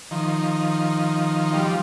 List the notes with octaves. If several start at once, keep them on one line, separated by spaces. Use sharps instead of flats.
D#3 F3
F3 G3